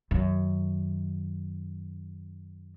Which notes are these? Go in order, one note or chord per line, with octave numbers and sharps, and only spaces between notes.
F#2 D#3